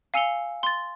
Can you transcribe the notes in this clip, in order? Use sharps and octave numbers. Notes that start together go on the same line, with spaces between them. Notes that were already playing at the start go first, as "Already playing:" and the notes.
F5 G#5 E6 C#7 F7 G7
C6 A6